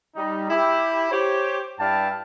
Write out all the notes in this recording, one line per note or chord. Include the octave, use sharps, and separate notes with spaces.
G3 D#4
E4 G4
G4 C5 C#5
G2 E4 D5 F5 G5 A5